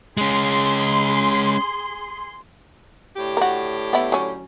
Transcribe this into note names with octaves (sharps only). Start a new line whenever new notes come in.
G#3 C#4 G#4 C6
A2 D3 G4
F#4 A#4
B3 E4
F#3 C#4